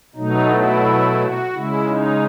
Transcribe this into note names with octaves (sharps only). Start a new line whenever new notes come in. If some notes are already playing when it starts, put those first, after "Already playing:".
B2 F#3 A3 D#4
E4
F#4
C#3 G#3 E4
D#4